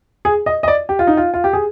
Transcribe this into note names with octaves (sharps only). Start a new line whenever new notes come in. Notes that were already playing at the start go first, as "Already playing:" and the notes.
G#4
D#5
D#5
D5
G4
F4
D#4
F4
F4
G4
G#4